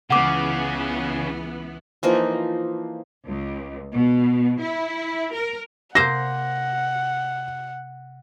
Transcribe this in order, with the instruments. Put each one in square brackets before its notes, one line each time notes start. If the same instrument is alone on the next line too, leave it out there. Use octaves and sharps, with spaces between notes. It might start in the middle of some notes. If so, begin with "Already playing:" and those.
[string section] C#2 E3 B3 [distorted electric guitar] C#3 [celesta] F#5 D6
[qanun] E3 F3 A#3 D#4
[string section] C#2
B2
E4
A#4
[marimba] C3 [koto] A#3 C5 [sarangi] F#5 [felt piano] A#6